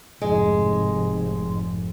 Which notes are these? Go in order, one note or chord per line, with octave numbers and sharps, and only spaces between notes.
F1 F2 G#2 G#3